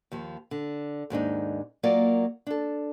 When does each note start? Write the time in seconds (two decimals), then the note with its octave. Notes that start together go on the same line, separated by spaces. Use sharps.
0.12 D#2 F3
0.51 D3
1.10 D#2 G#2 D4 D#4
1.83 F#3 A#3 F4 A#4 D5
2.47 D4 A4